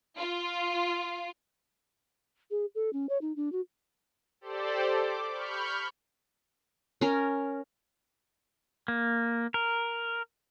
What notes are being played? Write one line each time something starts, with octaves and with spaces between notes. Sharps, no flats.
F4
G#4
A4
C#4
C#5
D#4
D4
F#4
G4 A4 C5 D5
D6
B5 C#6 F6 G6
C#4 A#4
A#3
A#4